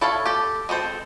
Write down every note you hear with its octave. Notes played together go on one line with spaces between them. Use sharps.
E4 A4 C#5 F5
G4 A4
G#3 C4 A4 C5